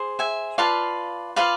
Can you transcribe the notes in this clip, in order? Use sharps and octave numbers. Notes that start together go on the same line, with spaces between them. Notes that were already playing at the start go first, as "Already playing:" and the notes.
Already playing: G#4 C5
E5 G#5
F4 B4 D5 F5 A5
F4 B4 D5 F5 A5